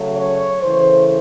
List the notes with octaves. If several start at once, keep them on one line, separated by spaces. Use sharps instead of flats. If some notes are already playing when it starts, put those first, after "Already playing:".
Already playing: C#3 F#3 A3
C#5
C#3 E3 A3 C5